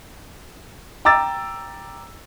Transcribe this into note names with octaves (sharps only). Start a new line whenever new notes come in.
G5 A#5 D6 E6 A6